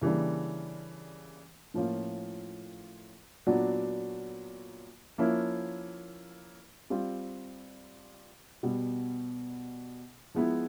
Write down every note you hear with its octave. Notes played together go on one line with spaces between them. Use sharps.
C#3 E3 G3 A#3 D4
A2 F3 A#3 C#4 F4
A#2 F#3 B3 D4 F#4
F3 A#3 C#4 E4
G3 C4 F4
B2 G3 B3
F3 G#3 B3 E4